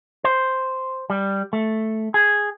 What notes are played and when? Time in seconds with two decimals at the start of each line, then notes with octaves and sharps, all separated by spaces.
0.24 C5
1.10 G3
1.53 A3
2.14 G#4